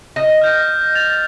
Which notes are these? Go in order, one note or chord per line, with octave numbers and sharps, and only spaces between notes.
D#5
F6 G6 A#6
A6 F7